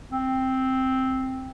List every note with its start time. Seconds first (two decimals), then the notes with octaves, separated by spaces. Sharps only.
0.12 C4